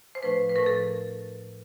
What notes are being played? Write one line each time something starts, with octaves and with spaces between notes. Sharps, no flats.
C5
A2 F3 A3 D4 B4
B4
A2 F3 A3 D4 A#4
A4